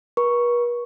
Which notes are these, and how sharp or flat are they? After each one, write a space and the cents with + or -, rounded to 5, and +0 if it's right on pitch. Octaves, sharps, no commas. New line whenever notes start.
B4 -45 C#6 +0